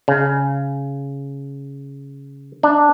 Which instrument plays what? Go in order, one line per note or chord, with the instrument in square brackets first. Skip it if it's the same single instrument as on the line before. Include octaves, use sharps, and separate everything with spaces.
[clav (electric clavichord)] C#3
D4